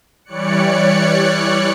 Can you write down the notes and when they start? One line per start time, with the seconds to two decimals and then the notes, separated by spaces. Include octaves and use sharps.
0.25 E3 G3 C#5 D5 F#6 C#7